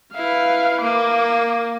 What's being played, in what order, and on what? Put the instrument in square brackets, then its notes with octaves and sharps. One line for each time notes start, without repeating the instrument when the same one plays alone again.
[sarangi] E4 [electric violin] B4 F5
[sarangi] A#3 [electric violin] D6